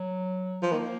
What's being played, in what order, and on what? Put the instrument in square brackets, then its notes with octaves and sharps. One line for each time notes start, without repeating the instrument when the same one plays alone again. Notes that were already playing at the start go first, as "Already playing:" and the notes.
Already playing: [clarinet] F#3
[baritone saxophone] F3
[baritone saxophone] D#3 [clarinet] A#3